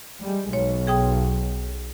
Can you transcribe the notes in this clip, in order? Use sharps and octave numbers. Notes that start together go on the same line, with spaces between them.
G3 G#3
B1 C#5
G#4 G5 D#6